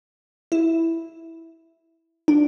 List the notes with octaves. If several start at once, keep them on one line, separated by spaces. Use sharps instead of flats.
E4
D4